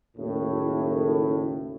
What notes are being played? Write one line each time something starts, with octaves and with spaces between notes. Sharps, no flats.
F#1 D#2 A2